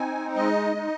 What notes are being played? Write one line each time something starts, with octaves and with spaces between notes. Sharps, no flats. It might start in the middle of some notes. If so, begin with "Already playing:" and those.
Already playing: C4 D#4 G#5
G#3 D#5
D#4